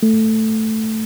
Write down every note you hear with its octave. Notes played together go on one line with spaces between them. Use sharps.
A3